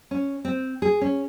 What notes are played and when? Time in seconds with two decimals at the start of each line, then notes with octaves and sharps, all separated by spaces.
0.11 C#4
0.45 C4
0.82 G#4
1.01 C#4